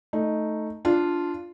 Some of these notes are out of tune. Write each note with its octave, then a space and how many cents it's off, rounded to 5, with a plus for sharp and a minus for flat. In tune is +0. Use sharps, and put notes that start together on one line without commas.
A3 +0 D#4 +0
D4 +0 F4 -5